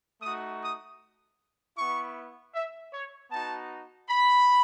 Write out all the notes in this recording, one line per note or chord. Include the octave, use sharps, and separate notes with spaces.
A3 D#4 F#4 D#6
D#6
B3 E4 C#6
E5
C#5
B3 D#4 F#4 A5
B5